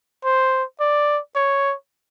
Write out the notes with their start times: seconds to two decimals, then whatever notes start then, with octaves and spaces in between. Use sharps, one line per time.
0.25 C5
0.80 D5
1.36 C#5